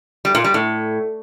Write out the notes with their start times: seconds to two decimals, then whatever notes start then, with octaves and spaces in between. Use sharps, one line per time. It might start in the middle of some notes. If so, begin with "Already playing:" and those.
0.25 G3
0.35 A#2
0.44 G3
0.54 A2